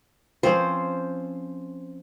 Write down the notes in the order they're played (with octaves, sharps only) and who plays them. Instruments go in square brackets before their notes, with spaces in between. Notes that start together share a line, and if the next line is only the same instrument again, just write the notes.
[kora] F3 C4 C#4 [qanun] C5